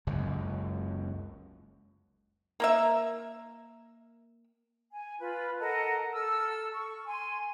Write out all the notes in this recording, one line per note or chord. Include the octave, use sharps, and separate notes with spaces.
F#1 C#2 F#2
A#3 A#4 E5
G#5
F4 B4
A4 A#4 D#5 F#5
A4 E6 F6
C#6
G#5 C6